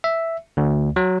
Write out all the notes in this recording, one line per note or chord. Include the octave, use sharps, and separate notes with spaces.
E5
D2
F#3